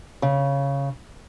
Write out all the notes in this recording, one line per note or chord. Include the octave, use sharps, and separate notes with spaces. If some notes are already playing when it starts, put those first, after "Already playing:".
C#3